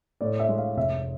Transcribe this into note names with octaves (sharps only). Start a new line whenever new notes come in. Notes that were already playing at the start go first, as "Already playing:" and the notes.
A2 D5
E5
G#3
F5
F1 E5